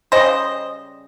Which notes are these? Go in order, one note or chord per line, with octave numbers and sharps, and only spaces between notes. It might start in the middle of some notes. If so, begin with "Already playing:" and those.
C#3 G3 C#4 C5 D#5